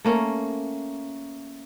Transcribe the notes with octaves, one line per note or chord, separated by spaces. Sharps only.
A3 A#3 C#4